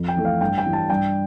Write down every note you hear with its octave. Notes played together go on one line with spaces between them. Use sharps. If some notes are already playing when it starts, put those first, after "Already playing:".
Already playing: F2
G5
E3 A3
F5
G2 G5
G5
E3 G3
A5
G2 G5